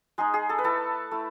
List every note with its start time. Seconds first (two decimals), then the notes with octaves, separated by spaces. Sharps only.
0.18 G#3 D#4 G#4
0.34 G#4
0.49 A4
0.58 B4
0.64 A3 E4 A4
1.11 A3 E4